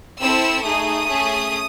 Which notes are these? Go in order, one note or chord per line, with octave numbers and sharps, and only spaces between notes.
C4 E4 A4 E6
A3 D#4 G#4 D#6
A3 C#4 G#4